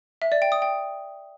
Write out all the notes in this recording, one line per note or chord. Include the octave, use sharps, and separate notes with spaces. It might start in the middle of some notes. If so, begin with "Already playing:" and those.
E5
D5
G5
D#6
G5